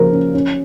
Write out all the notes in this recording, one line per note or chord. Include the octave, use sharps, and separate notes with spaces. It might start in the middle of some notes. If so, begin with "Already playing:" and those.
Already playing: C#3 F3 A#3 A#4 C5
C#4
C#4